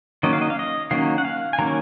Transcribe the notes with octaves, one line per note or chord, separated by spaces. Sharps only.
D#3 F#3 A#3 C#4 D#5
F5
D#5
F5
D#5
D#3 F#3 A#3 C#4 F5
F#5
F5
G#5
D#3 F#3 A#3 C#4 A#5